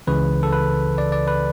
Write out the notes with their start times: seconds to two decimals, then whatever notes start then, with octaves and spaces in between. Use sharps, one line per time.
0.07 C#2 C#3 E3 B4
0.43 A4
0.53 B4
0.98 D5
1.12 D5
1.28 B4